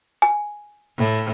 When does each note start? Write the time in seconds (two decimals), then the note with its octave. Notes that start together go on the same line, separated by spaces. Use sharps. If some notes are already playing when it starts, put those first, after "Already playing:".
0.22 G#5
0.98 A2